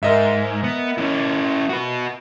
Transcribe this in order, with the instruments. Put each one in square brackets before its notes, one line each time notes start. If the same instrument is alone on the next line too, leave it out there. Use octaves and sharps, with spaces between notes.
[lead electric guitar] G#2 [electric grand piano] A#4 D#5 E5
[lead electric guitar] B3
C#4 E4
F#4 B4